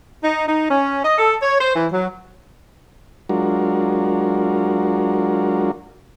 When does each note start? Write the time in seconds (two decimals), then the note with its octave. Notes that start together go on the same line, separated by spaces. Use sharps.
0.24 D#4
0.47 D#4
0.70 C#4
1.04 D#5
1.18 A4
1.42 C#5
1.60 C5
1.76 E3
1.92 F#3
3.29 F#3 G#3 D4 F4 F#4 A#4